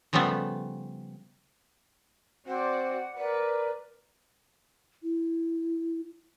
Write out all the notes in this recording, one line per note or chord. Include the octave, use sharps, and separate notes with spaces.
C#3 F3 G3 A3 B3
C4 F#4 C5 D5 F#5
A#4 B4 D5
E4